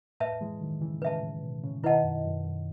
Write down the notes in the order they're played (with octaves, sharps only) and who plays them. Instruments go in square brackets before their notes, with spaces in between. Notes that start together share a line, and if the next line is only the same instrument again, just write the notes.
[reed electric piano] A2 [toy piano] B4 E5 A5
[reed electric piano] E3 G#3
D#3 F#3
C#3 E3
[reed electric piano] A2 C#3 [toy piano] B4 E5 A5
[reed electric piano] A2
B2
A2 C#3
[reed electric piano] B2 D#3 [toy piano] E4 B4 D#5 F#5 A5
[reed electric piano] F#2
F#2
F#2